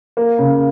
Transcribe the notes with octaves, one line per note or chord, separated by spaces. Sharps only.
A#3
C#3